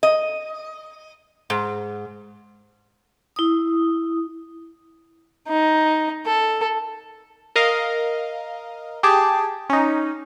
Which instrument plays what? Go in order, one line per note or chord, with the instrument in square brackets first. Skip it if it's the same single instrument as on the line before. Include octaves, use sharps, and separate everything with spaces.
[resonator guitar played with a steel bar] D#5
G#2
[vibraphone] E4 D#6
[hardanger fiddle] D#4
A4
[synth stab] A#4 D#5 F5
G4 G#4 A5 D6
C#4 D#4